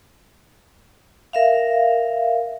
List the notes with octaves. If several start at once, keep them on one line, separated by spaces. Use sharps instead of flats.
A#4 E5 F5